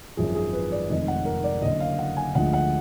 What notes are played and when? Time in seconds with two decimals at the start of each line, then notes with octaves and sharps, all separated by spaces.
0.17 G#1 F#2 F3 G#4
0.35 G#4
0.53 B4
0.72 D5
0.89 F1 F2 D#3 G#3 D#5
1.08 F#5
1.25 A#4
1.44 D5
1.62 F#1 F#2 D3 D#5
1.80 F5
1.99 F#5
2.17 G#5
2.35 D2 D3 F3 G#3 F#5
2.53 F#5